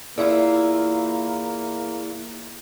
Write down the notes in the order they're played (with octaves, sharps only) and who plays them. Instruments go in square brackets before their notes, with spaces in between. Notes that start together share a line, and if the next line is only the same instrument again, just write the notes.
[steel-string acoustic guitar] E2 E4 F4 [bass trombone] A#3